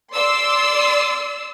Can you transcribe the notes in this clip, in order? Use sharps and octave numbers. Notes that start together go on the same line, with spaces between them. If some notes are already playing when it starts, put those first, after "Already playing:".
D5 C6 E6